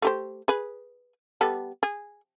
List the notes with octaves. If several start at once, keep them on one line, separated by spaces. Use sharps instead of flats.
A3 G4 C5
G#4 B4
G3 B3 A4
G#4